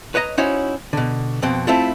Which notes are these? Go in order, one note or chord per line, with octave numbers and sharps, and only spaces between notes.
B4 C#5 D#5 A#5
C#4 D#4 E4 F#4 C5 C#5
B2 D3
F2 B2 C4
A3 C4 E4 F4 A4